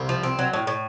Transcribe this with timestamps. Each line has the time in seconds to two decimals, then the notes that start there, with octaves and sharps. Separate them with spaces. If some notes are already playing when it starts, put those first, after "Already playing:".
Already playing: C2 C3
0.09 F3
0.23 C4
0.39 F#3
0.53 A2
0.67 A2